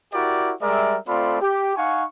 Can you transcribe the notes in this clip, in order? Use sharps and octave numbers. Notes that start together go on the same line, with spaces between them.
E4 F#4 G4 A#4 D5
G3 G#3 A#4 D5 E5
A3 C4 F4 A4 D5 B5
G4
D#4 F5 F#5 G#5 C#6